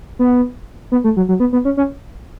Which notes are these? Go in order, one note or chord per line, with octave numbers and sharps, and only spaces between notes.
B3
B3
A3
F#3
F#3
B3
B3
C#4
C#4